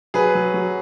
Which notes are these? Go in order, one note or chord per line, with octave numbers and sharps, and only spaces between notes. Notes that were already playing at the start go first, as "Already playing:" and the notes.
F#3 G#4 B4
F#3
F#3